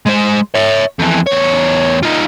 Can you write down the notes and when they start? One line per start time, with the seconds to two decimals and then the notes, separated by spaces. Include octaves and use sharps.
0.07 G#3 C5
0.55 C#5 E5
0.99 F2 E3
1.27 E2 C#5
2.03 D#4 F4